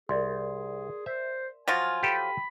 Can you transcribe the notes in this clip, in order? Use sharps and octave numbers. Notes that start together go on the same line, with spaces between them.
C2 G#4 A#4 D5 C6
C5 E5
F3 F#3 F4 G#5
G4 A4 G5 B5 D#7